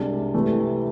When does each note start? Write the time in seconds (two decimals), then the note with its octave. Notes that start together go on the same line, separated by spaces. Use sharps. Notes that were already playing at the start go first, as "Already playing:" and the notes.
Already playing: C2 C3 G#3 D4
0.34 C3 E3 A3